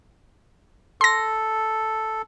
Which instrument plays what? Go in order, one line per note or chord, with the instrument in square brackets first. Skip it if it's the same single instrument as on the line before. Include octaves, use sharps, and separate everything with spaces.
[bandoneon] A4 [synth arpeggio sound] C6 A#6